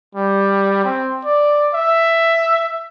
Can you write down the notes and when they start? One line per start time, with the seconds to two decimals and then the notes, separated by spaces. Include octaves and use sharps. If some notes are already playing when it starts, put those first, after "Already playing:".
0.15 G3
0.84 C4
1.24 D5
1.74 E5